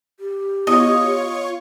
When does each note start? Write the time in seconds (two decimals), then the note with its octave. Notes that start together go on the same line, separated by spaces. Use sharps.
0.20 G4
0.67 B3 E4 F4 C#5 D#5 C#6